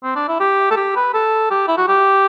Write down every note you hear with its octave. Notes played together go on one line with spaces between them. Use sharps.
C4
D4
E4
G4
A4
G4
B4
A4
G4
E4
F#4
G4